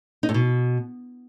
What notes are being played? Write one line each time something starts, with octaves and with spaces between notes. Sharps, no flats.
D#4
A2
B2